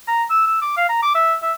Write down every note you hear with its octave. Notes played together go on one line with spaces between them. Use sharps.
A#5
E6
E6
D6
F5
A#5
D6
E5
E5